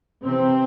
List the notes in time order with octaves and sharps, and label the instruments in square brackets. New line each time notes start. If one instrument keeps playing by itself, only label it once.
[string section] C3 E3 C4